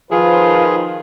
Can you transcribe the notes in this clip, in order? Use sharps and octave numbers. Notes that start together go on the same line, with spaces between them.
D#3 F3 F4 G#4 B4